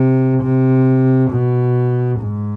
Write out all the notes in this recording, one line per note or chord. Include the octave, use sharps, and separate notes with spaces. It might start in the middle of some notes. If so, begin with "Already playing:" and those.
Already playing: C3
C3
B2
G#2